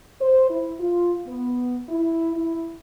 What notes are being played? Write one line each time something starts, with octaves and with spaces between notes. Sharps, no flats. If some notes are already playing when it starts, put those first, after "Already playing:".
C5
E4
F4
B3
E4
E4